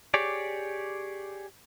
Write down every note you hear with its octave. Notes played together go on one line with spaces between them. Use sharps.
G4 G#4 C#5 D5